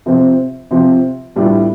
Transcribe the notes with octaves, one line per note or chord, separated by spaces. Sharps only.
C3 F3 C4
C3 F3 C4
A2 G3 B3 D4 F4